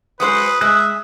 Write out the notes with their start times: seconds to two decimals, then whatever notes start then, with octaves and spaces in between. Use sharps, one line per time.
0.20 F#3 G#3 B4 C5 D#6
0.61 G#3 E5 F#6